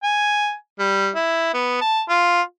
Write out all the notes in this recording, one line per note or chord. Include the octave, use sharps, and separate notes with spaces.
G#5
G3
E4
B3
A5
F4